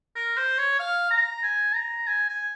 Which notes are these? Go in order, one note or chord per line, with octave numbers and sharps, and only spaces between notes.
A#4
C5
C#5
F5
A#5
G#5
A#5
G#5
G#5